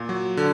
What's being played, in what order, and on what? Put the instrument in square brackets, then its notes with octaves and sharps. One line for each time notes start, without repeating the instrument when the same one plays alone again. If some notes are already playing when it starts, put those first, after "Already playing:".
Already playing: [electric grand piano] A#2
F#3
D3